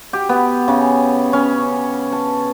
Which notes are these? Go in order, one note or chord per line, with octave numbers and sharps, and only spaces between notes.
G4
B3
C#3
C#4
A5